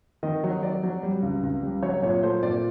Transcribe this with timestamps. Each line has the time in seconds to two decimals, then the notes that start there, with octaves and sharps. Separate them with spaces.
0.23 D#3 D#5
0.44 F#3
0.63 F#3 D5
0.83 F#3
1.03 G3
1.22 C#2
1.43 C#2
1.62 G3
1.83 F#3 C#5
2.02 A#2 C#5
2.23 A3 C5
2.43 A#2 D5